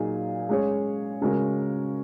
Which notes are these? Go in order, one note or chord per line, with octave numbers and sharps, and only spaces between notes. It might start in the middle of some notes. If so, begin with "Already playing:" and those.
Already playing: A#2 F#3 D#4 G#4
G#3 C#4 G#4 C#5
C#3 G#3 C#4 F#4 A#4